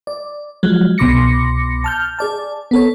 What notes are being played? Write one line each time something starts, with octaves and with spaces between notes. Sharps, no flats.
D5
F3 F#3 G#3
C2 B2 C6 D6 A#6 C#7
A5 F6 G6
G#4 D5 A5
B3 A4 C#5